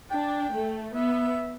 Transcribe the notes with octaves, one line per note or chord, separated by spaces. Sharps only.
D4 G5
A3
B3 E5